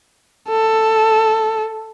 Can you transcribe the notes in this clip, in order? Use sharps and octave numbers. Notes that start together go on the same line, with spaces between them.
A4